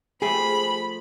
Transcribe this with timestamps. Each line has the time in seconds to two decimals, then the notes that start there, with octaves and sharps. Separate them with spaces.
0.22 F3 A3 G4 G#4 B5